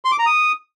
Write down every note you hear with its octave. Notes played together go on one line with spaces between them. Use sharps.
C6
D6
A#5
D#6